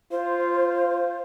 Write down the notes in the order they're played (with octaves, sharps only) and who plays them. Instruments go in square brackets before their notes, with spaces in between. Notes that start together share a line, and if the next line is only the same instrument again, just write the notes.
[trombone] F4 [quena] C5